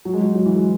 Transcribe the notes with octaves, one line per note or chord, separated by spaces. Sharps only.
F#3
G#3
F#3
F#3
E3
G#3